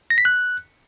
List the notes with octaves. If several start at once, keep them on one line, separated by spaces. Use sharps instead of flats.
A#6
B6
F#6